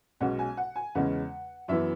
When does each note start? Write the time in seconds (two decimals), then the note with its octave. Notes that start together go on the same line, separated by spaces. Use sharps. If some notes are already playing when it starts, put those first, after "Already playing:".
0.21 B1 B2 G#3 C#4 F#5
0.39 G#5
0.57 F#5
0.76 G#5
0.95 E2 C#3 G#3 C#4 F#5
1.68 F#2 E3 B3 E5